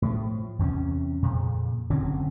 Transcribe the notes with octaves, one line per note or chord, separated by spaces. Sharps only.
A2 F3
E2 C3 B3 C#4
F2 A#2 C#3
F#1 D3 C4 C#4